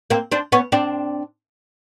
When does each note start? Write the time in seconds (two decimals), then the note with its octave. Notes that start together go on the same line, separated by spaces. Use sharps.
0.10 A#3 C4
0.32 C4 D4
0.52 B3 C#4
0.72 C4 D4